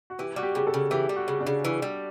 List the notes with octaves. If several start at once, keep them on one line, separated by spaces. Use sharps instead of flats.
F#4
E3 G4
G3 F#4
G4
C#3 G4
A4
C#3
E3 G4
G3
F#4
C#3
D4
C#3
E3
G3